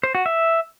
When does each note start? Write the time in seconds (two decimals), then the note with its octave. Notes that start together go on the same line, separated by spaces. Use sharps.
0.03 C5
0.15 F#4
0.26 E5